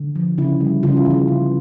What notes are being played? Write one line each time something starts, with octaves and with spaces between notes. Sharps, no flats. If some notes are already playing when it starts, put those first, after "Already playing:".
Already playing: D3
F3
C#3 E4
G3
C#3 F4
E4
E3 F4
C#3